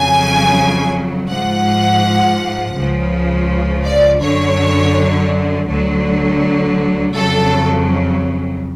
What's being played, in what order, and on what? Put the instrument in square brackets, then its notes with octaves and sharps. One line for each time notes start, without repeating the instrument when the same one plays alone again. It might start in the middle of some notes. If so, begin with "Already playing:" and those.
Already playing: [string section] F2 C#3 F#3 G#5
G#2 F3 F#5
C#2 C#3 F3
D5
F#2 D3 F#3 C#5
D2 D3 F#3
F2 C#3 F#3 A4